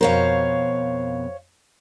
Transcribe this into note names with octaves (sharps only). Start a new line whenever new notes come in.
F2 B2 A#4 C5 C#5 F5